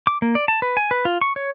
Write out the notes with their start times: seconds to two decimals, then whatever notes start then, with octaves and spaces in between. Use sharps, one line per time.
0.07 D6
0.22 A#3
0.35 D5
0.48 A5
0.62 B4
0.77 G#5
0.91 B4
1.05 F4
1.21 C#6
1.36 C#5